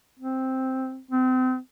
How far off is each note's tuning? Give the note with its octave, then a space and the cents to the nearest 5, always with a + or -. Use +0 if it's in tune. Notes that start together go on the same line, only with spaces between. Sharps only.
C4 +0
C4 -35